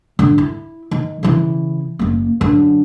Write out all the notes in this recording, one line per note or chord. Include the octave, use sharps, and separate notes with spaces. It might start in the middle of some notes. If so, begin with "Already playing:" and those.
D3
E4
D#3
C#3 E3
F#1 A#3
F#2 D3